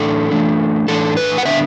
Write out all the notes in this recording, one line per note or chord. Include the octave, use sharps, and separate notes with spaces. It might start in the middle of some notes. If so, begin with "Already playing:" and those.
Already playing: A2 E3 D4 A4
E3 A3 D4
A2 E3 D4 A4
B4
F#5
D3 B3 D4 E5